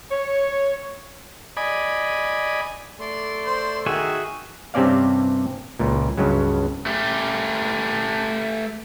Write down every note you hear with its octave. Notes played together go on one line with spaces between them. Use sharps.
C#5
D5 D#5 G#5 B5
A3 D5 C6
C5
D#3 F#4 G#4 E5
G2 C3 C4 C#4 D5 F5
C#2 A#2
C#2 G2 C#3 F#3
A3 G4